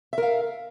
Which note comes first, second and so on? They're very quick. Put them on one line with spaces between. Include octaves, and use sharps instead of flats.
E5 A#4 F5